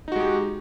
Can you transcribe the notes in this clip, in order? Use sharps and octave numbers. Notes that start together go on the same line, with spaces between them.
G#3 D#4 F#4 G4